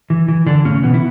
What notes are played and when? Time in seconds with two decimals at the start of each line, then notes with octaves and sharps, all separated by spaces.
0.10 E3
0.28 E3
0.46 D3 E3 D4
0.65 A2 C#3 C#4
0.83 B2 E3 B3
0.94 E4